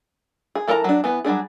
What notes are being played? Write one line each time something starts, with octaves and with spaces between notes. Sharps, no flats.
G#4
E3 A4 A#4 A5 A#5
F#3 D4
E3 B3
F#3 G3 D4 G#4